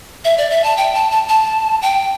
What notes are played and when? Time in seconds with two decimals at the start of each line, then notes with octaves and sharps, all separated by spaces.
0.25 E5
0.38 D5
0.50 E5
0.64 A5
0.77 G5
0.95 A5
1.11 A5
1.28 A5
1.82 G5